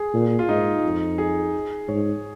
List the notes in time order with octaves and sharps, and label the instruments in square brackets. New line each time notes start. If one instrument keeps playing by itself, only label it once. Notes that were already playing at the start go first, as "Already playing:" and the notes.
Already playing: [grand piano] G#4
[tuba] A#2
[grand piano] F4
[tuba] G#2 [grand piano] D#4
[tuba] F2
[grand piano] G#4
[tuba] G#2 [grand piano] C#5